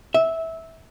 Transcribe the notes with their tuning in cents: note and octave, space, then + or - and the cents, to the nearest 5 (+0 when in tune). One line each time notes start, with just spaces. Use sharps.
E5 -15